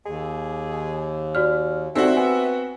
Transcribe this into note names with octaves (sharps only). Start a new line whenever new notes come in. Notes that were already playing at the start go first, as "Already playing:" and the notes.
D#2 G#4
F#4 D5 F6
A3 C4 D#4 F#4 G4 D5 E5
B3 G#5